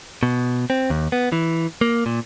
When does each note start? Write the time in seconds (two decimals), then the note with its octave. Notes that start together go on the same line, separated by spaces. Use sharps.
0.23 B2
0.70 C4
0.90 D#2
1.12 B3
1.32 E3
1.81 A#3
2.06 A#2